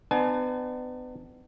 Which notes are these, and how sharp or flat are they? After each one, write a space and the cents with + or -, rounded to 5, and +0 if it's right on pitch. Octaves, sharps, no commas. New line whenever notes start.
B3 +35 D4 +45 G#5 +45